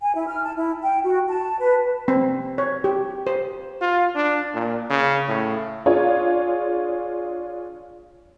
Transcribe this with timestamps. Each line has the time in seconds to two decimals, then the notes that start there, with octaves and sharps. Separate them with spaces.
0.01 G#5
0.15 E4
0.27 F6
0.44 A5
0.57 E4
0.80 G5
1.02 F#4
1.28 A5
1.60 B4
2.08 C4
2.58 C#5
2.84 G4
3.27 C5
3.81 F4
4.15 D4
4.54 A#2
4.90 C#3
5.28 A2
5.86 D4 F4 G#4 C#5